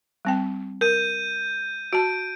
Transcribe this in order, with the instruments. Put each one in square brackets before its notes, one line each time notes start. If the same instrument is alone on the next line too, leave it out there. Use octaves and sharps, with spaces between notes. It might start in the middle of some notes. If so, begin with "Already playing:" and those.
[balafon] G3 C4 G5
[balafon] A#4 [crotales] G6 D#7
[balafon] F#4 A5 [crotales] D7